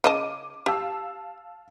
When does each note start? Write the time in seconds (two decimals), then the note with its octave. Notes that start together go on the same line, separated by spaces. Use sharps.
0.04 C#3 D#5 A5 D6 D#7
0.66 G4 F5 A5 E6